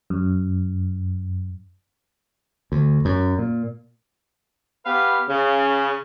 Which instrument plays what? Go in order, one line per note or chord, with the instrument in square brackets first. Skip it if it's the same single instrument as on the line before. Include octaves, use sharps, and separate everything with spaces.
[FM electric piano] F#2
[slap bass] D2
F#2
A#2
[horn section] B3 G4 B4 F5
C#3